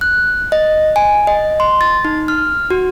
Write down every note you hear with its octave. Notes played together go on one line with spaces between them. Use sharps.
F#6
D#5
G#5
D#5
C6
A6
D#4
F6
F#4